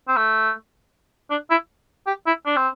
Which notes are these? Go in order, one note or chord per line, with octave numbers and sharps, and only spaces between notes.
C4
A3
D4
E4
G4
E4
D4
C4